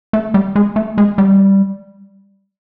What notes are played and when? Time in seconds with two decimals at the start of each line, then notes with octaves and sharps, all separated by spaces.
0.13 A3
0.34 G3
0.56 G#3
0.76 A3
0.98 G#3
1.18 G3